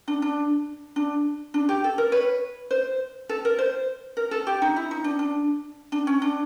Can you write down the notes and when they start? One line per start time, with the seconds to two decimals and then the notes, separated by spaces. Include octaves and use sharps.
0.08 D4
0.22 D4
0.96 D4
1.54 D4
1.69 G4
1.84 A4
1.98 A#4
2.12 B4 C#5
2.71 C5
3.29 A4
3.45 A#4
3.59 C5
4.17 A#4
4.31 A4
4.47 G4
4.62 D#4
4.76 E4
4.91 D#4
5.04 D4
5.19 D4
5.92 D4
6.07 C#4
6.22 D4